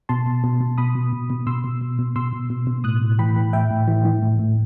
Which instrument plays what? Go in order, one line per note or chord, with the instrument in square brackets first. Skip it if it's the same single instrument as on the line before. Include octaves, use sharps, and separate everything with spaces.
[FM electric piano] B2 A5 C6
B2
B2
B2
B2 B5 D#6
B2
B2
B2
B2 C6 E6
B2
B2
B2
B2 C6 E6
B2
B2
B2
A2 D#6 F#6
A2
E3 G5 B5
E3
A2 E5 G5
A2
E3
E3
A2
A2